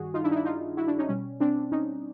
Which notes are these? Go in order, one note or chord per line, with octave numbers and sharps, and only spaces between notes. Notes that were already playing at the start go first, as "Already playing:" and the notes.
Already playing: G2 D#3 G3 F#4 G#4
D#4 F4
D4 E4
D#4
D4 E4
D#4 F4
E4 F#4
D4 E4
C#4 D#4
B2 G3 C#4
C4 D4
C#4 D#4